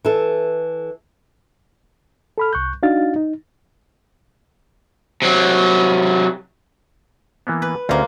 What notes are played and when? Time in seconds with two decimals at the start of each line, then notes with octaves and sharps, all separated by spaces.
0.05 E3 A4
2.38 A4 B5 F6
2.53 C2 C#6 F#6 G6
2.83 D4 D#4 F#4 F5 A6
3.16 D#4
5.22 C3 F#3
7.47 E3 A#3 B3
7.62 B4
7.89 D2 A#3 C4 C#4 F4